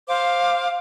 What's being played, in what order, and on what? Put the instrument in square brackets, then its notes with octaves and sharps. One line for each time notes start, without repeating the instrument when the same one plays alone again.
[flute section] C5 F5 D6